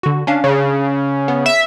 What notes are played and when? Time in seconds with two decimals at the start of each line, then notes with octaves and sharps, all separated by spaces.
0.03 D3 F#4
0.27 C#4 D4 F5
0.44 C#3
1.28 B3
1.46 E5